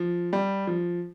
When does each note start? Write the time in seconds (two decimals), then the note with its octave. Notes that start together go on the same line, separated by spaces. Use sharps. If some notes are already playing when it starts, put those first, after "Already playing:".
Already playing: F3
0.33 G3
0.67 F3